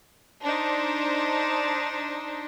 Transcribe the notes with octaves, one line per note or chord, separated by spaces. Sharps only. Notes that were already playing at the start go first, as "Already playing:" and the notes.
D4 D#4 C5